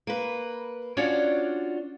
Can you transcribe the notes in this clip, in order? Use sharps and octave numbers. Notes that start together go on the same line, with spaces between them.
A#3 B4
C#4 D4 F4 F#4 C#5 D5